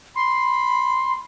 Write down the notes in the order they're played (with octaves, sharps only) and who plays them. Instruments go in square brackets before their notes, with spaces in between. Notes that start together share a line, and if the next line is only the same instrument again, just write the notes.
[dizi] B5 [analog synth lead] C6